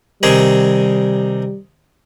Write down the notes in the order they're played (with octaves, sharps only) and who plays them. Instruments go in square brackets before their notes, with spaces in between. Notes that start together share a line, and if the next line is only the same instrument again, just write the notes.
[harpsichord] C3 D#3 G#4 [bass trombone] G3